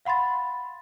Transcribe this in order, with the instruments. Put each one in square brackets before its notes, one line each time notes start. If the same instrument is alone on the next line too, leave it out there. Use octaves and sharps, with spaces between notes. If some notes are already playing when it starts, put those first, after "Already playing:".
[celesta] F5 F#5 B5 C6 A6